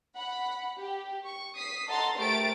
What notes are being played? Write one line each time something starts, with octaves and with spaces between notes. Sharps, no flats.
F#5 B5
G4
C#6
D#6 B6 C7
A4 D#5 F#5 A#5 C6 A6
A3 G4 A#4 C5 A6 D7